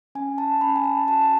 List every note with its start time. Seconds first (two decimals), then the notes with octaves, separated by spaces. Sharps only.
0.15 C#4 G#5
0.38 A5
0.61 C#4 B5
0.76 G#5
0.84 A5
1.08 F#4 A5